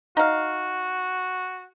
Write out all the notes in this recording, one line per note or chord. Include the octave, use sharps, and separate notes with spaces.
D#4 F#4 F5